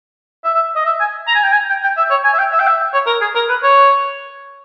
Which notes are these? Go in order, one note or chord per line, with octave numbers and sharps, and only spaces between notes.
E5
E5
D#5
E5
G#5
A#5
G#5
G5
G#5
G5
G5
E5
C#5
G#5
E5
G5
E5
G5
E5
C#5
A#4
G#4
A#4
B4
C#5